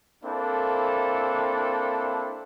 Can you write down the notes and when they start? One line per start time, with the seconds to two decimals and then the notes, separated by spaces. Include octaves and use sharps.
0.24 A#3 C4 D4 E4 A4